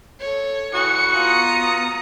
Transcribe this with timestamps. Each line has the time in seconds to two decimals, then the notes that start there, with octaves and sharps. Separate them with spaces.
0.20 A4 C#5
0.74 E3 F#4 D#6 C#7
1.15 B3 F4 A#5 D#6